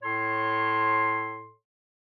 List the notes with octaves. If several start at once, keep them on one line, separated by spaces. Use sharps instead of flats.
A2 A4 C#5 C6